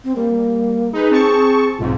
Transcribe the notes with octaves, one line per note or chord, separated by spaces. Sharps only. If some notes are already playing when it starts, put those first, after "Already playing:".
C4
G3 A#3
D#4 G#4 B4
C4 A5 C#6
B1 G#2 C3 F4